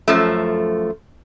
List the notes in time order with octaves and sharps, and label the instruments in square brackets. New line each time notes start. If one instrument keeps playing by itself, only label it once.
[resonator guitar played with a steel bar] F#2 F3 A3